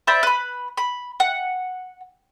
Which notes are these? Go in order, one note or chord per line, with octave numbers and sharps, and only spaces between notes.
C5 D5 E5 B5
B4 B5
B5
F#5